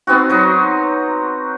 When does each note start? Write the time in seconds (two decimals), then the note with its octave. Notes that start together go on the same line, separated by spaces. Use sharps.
0.07 B3 C4 D#4 F#4
0.30 F#3 D#4